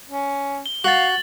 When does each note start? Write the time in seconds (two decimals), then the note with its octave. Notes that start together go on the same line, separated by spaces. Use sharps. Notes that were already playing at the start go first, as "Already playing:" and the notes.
0.09 C#4
0.66 G7
0.84 F#4 F5 A6 F#7